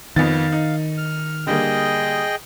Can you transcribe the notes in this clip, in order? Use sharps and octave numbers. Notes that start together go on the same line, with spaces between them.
F2 D#3 B3 F5 A6
D#4
F6
D3 G3 A#3 G#4 D#5 G5